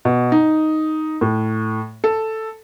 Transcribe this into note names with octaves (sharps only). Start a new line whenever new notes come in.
B2
D#4
A2
A4